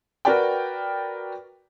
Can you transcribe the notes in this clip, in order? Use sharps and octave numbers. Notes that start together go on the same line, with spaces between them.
F#4 A#4 B4 D5 G5